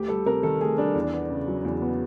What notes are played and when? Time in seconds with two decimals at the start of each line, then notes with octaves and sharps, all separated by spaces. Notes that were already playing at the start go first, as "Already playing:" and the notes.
Already playing: D2 G4
0.08 G3 A4
0.26 C3 A#4
0.43 D#3 A4
0.61 D2 G#4
0.78 G3 D4
0.95 E2
1.13 B3
1.30 C#3
1.47 F#3
1.65 E2
1.82 B3